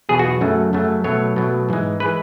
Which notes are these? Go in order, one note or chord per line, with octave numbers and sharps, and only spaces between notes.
E2 B2 F#3 G#4
F#4
F#2 C#3 F#3 A3
F#2 C#3 F#3 A3
B2 F#3 A3 C#5
B2 F#3 A3
G#2 E3 G#3
E3 G#3 B4